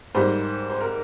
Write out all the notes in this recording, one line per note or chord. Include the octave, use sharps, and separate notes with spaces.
G#2 G3 A#3 C5
C5
A#4